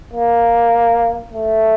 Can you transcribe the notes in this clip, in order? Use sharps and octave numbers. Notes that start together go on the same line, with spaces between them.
A#3
A3